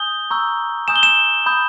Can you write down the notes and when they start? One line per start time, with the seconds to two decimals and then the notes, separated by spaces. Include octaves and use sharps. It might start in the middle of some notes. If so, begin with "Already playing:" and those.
Already playing: G#5 D#6 G6 G7
0.31 A#5 C#6 E6 G6
0.88 G#5 D#6 G6 E7
0.96 G7
1.03 E7
1.46 B5 D#6 G6